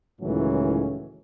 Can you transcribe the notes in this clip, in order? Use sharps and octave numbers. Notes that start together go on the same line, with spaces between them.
C#2 A2 D#3 E3 F#3 C#4